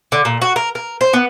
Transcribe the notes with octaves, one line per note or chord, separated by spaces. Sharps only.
D3
A#2
F#4
A#4
A#4
C5
B3